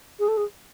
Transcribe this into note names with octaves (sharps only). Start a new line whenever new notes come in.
G#4
A4
G#4